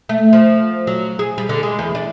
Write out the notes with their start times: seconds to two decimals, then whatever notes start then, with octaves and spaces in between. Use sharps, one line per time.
0.09 A3
0.33 F3
0.87 F#3
1.19 G#4
1.38 G3
1.49 D3
1.63 G#3
1.79 E2
1.95 D4